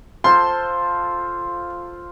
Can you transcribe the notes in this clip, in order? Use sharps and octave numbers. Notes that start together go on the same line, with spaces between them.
F4 A4 C5 C6